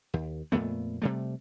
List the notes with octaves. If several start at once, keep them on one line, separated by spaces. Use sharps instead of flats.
D#2
F2 A#2 A3 B3
C3 G3 A3